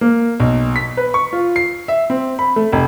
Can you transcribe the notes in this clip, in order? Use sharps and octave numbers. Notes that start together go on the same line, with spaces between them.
A#3
B1
B6
B4
C#6
F4
C7
E5
C4
B5
A3
F1